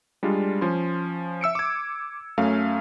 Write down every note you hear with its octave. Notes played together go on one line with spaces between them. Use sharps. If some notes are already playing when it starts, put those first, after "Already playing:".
G3 G#3 D4 F4
F3 C#4 C6
E5 E6 C#7 D7
D6 G#6
F#2 A3 C#4 F5